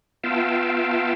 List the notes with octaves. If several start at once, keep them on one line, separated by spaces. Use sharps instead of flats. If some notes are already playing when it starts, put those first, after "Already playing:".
B3 F4 E5 F5 G5 A5